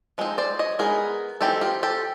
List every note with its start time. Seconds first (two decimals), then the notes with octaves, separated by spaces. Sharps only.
0.18 F3 G#3 C4 D#4
0.38 C5 D5
0.59 C#5 D#5
0.79 G#3 B3 D#4 G#4 A#4
1.41 E3 G#3 C4 D#4 G4 A4
1.61 F4 G4
1.83 G4 A4